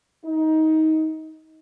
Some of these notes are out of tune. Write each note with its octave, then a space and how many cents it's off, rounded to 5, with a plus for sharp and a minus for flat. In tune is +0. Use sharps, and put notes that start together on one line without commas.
D#4 +20